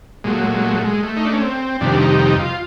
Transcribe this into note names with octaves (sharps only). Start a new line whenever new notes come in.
A#2 F#3 G#3
A3
G#3
A3
G#3
A3
G#3
A3
G#3
A3
D#4
D4
C#4
C4
F2 C3 D#3 G3 D4
D#4
D#4
F4